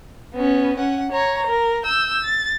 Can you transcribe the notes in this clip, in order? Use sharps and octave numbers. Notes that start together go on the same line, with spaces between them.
B3 C#4
C#4 F#5
C#5 A#5
A#4
E6 G6
A6